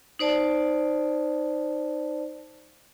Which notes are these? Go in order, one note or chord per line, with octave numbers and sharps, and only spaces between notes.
D#4 C5 D5 A5